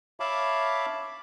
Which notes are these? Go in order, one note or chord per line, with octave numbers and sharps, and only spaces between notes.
C#5 E5 F5 A5 B5 D6